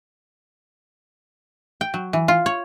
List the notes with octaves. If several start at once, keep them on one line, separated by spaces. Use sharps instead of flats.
G5
F#3
E3
F4
C#5